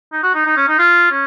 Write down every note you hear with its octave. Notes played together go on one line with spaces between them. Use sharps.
D#4
F#4
D#4
D#4
C#4
D#4
F4
C#4